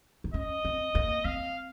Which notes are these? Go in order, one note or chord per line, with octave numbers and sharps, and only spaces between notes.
D#4
C#4 D#5
C4
A#3
C4 F5